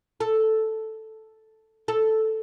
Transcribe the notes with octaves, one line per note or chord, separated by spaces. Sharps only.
A4
A4